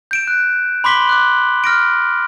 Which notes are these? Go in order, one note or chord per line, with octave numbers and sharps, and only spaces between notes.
G6 D7 E7
F#6
B5 C6 D6 B6 F#7 G7
D6 F#6
F6 A#6 D7